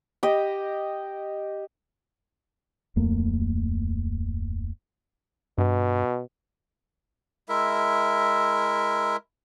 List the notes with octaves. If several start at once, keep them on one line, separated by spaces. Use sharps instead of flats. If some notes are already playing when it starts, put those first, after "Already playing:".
G4 D#5
D1 F2 A3 A#3
G2 B2
G#3 E4 A#4 E5